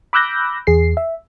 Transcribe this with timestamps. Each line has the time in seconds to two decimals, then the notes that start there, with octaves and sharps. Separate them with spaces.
0.13 B5 D6 E6 F#6 G6 A#6
0.67 E2 G#4 C7
0.97 E5